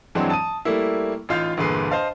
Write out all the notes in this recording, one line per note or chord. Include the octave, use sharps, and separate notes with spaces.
G2 E3 F#3 G#3 C4 D4
A5 D#6 D#7
G3 A3 A#3 E4
A1 D#4 F4 F5 G6
G1 E2 A#2 G#4 B4 C7
C5 D#5 F5 A5